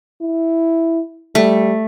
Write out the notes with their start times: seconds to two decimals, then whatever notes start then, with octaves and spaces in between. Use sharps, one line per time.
0.21 E4
1.35 G3 A3